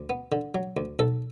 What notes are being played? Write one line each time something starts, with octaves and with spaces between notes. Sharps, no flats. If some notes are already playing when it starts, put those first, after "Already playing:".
Already playing: D2
B3
D3
F#3
D2
B1 A4